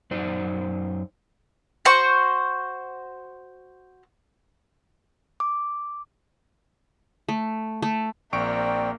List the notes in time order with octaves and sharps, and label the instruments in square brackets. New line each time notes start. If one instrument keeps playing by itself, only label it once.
[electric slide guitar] F#2 D#4 C5 D5
[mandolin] F#4 C5 C#6
[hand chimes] D6
[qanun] A3
A3
[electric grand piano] A#1 C#6 D7 [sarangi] A#3 [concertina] C4 G5 [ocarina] D5